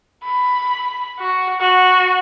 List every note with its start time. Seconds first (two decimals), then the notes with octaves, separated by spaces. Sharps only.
0.24 B5
1.19 F#4
1.61 F#4